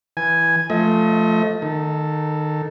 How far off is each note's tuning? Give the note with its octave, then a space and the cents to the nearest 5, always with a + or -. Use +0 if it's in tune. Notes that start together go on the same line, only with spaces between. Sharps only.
E3 +0 G#5 +0
F3 -10 A3 +0 D#5 +35
D#3 -20 A4 +0